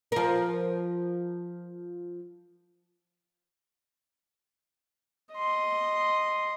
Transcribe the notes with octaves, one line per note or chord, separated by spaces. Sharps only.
F3 A#4
D#5 C6